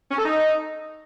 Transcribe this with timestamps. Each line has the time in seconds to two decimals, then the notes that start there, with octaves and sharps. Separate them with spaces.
0.11 C#4
0.18 A4
0.25 D#4